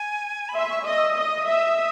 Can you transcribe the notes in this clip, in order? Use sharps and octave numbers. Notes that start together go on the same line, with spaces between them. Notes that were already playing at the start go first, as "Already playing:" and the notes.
Already playing: G#5
B5
E5 C6
C#6
D#5 D#6
E6
D#6
D#5
E5
D#6